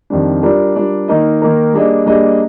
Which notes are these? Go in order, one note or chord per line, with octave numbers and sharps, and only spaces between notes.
F2 D#3 G3 D4
G3 D4 F4 A#4 D5
G3 D4 F4 A#4 D5
D#3 A#3 D#4 A#4 D#5
D#3 A#3 D#4 A#4 D#5
G3 A#3 D4 G#4 D#5
G3 A#3 D4 G#4 D#5